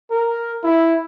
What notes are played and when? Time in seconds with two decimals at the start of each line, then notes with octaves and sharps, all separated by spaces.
0.11 A#4
0.64 E4